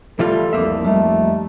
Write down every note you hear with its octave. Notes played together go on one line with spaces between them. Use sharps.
E3 G3 A3 F4 A4
C2 F2 A#3 E5
G3 A3 D#4